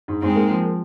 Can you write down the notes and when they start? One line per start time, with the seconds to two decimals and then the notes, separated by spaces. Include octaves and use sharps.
0.08 G#2
0.22 G#2 G#3 C4
0.36 A#3
0.50 F3